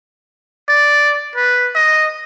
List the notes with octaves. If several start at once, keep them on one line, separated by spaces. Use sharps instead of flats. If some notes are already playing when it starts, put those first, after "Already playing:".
D5
B4
D#5